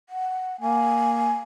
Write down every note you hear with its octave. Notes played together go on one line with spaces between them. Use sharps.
F#5
A#3 G#5